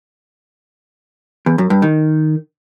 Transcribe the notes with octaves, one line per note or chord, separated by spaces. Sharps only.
E2
F#2
G2
D#3